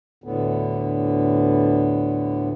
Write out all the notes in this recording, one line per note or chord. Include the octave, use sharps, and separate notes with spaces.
D2 A2 D3 B3